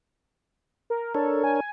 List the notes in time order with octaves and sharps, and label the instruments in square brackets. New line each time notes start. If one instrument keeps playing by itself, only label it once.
[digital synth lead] A#4
[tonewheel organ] D4 A#4 C#5 [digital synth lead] A4
[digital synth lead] G#5